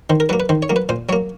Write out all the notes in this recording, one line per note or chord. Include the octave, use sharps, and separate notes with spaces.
D#3 C5
A#4
F#3 A#3 B4
B4
D#3 C5
C#5
F#3 A#3
B4
A#2 C5
F#3 A#3 C#5